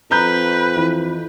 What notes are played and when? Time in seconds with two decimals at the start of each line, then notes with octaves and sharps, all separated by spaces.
0.11 F2 B4 A#5 G6
0.76 E3